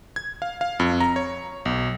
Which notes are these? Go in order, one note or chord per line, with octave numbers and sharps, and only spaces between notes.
G#6
F5
F5
F2
A#5
C#5
B1